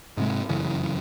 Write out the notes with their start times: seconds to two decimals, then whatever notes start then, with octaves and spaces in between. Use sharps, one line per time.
0.17 G#2 C3 G#3
0.49 F1 F#2 C#3 E3